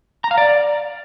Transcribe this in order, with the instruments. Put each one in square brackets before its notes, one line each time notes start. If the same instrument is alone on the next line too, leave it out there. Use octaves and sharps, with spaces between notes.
[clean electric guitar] A#5
F5
D5